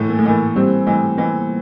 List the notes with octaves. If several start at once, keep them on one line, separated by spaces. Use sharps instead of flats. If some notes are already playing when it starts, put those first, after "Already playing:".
Already playing: A2 E3
A#3
A3
E3 A#3
G3 C4
E3 A3
E3 B3